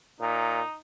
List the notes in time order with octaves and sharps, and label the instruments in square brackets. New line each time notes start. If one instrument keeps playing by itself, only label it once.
[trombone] A#2 [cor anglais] D#4